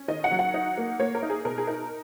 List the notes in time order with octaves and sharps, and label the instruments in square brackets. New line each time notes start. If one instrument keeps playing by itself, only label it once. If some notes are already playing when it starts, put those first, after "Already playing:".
Already playing: [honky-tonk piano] C#4
D#3 D#5
F#5
F#3
F#5
D#4
A#3
A#3 C#5
A#4
D#4
G#4
B2 A#4
G#4
D#4 A#4